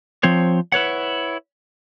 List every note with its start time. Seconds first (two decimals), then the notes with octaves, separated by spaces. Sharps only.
0.23 F3 C4 C5 C#5
0.72 E4 B4 C#5 F#5